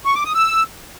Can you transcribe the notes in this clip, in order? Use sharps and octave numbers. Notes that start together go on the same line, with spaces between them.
C#6
D6
D#6
E6